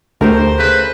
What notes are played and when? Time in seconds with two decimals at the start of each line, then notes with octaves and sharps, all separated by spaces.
0.21 D2 A3 G4 A#4 C5
0.59 C#3 B4